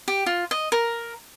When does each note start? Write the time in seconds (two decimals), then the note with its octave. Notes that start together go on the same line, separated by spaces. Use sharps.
0.08 G4
0.26 F4
0.51 D#5
0.72 A#4